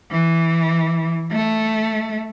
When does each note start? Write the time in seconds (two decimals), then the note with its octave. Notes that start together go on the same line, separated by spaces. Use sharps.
0.11 E3
1.32 A3